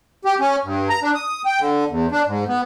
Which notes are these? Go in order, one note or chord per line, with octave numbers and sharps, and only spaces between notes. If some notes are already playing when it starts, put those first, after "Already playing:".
G4
C#4
G2
A#5
D4
D#6
G5
D3
E2
D4
G#2
B3